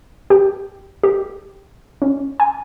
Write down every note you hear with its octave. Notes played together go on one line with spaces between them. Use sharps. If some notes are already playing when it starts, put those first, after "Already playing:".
G4
G4
C#4
G#5